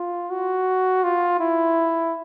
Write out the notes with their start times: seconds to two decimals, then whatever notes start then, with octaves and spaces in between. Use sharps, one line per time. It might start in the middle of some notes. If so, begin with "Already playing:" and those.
Already playing: F4
0.30 F#4
1.03 F4
1.40 E4